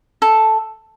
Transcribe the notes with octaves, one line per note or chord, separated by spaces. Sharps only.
A4